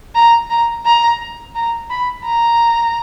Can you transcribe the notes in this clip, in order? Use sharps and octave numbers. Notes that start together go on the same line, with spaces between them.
A#5
A#5
A#5
A#5
B5
A#5